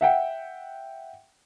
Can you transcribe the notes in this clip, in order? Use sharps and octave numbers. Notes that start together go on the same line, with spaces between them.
E5 F#5 G5